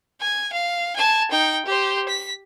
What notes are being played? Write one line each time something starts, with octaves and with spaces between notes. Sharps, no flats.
G#5
F5
G#5 A5
D#4 G5
G4 C5
B6